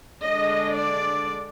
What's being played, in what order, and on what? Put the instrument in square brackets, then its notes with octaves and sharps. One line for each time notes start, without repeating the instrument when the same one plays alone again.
[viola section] D3 G#3 D4 D#5
D5